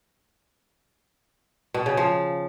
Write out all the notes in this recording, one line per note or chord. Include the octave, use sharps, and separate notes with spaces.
B2
C#3
F3